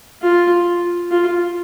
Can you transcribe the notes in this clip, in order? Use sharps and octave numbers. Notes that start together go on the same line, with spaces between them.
F4
F4